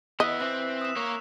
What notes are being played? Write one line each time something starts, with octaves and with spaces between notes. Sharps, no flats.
B3 E4 D#5 E6 F#6 B6
E3 C4 F#6
D#6 E7
A#3 A#4 C#5